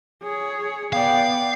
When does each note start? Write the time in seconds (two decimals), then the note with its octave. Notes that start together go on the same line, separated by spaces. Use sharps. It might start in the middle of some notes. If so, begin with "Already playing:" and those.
0.23 G#4 C#5
0.93 B3 D5 F5 G5